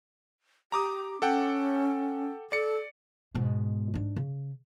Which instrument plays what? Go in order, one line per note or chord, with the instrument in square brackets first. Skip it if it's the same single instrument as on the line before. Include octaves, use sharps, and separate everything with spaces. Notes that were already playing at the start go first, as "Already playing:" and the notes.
[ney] G4 [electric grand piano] A#5 D6 D#6
[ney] C#4 [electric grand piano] A4 F#5 G5
[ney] A4 [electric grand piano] D5 C#7
[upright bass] G#2 B2
G#2 D4
C#3